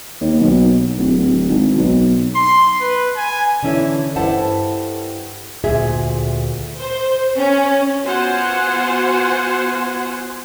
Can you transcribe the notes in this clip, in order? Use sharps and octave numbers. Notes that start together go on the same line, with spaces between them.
D#2
B1
D1
D1
G#1
B1
C6
B4
G#5
D3 E3 C#4 E4 A4
G2 E4 A4 C5 F#5 A5
D2 A#2 F4 G#4 E5
C5
C#4
B3 F4 F#4 C5 F#5 G#5